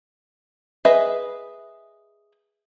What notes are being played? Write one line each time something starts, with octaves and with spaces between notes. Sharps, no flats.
G#4 B4 D#5 E5